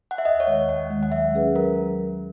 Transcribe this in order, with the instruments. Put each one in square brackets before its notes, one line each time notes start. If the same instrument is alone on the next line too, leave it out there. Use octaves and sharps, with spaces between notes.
[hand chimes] F#5
E5
[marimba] D#2 [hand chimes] D#5
[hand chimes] C#5
[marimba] D#3 G#3
[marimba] D#2 [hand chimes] F#5
[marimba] D#3 G#3
[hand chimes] F#5
[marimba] F#3 [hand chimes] E5
[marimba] C#4 G#4 B4
[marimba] F#3 [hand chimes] A#4